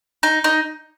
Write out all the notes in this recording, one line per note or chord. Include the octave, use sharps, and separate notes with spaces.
D#4
D#4